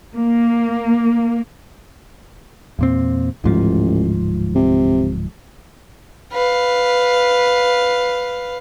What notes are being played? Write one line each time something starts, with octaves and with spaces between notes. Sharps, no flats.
A#3
E2 A#2 C4
D1 A1 G#2 F3
C3
B4 F5